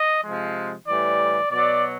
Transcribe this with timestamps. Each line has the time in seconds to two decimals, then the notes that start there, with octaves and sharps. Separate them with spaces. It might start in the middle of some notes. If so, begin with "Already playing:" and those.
Already playing: D#5
0.23 C3 F3 G#3
0.87 A2 E3 G3 D5
1.51 B2 F#3 D5